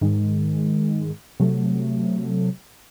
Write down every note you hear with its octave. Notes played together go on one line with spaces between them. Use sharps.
G#2 D#3 G#3
C3 F#3 A3